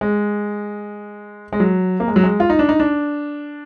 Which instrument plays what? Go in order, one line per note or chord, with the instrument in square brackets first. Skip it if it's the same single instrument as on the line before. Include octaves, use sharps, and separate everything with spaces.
[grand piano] G#3
G#3
F#3
A#3
G#3
F#3
G#3
F4
D#4
D4
D#4
D4